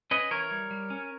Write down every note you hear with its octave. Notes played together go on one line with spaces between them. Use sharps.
C#4 B4 D#5
E3 A#4 C#5
G3
G3
C#4